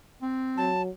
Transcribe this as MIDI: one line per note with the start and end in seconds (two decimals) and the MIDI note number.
0.22 0.70 60
0.57 0.89 54
0.57 0.82 81